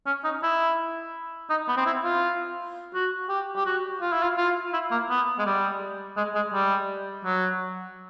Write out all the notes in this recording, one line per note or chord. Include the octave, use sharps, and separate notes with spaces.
C#4
D#4
E4
D#4
B3
C4
E4
F4
F#4
G4
G4
F#4
F4
E4
F4
F4
E4
A#3
B3
G#3
G3
G#3
G#3
G3
F#3